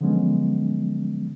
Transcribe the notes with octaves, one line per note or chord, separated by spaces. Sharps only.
D3 F3 F#3 G#3 B3 C#4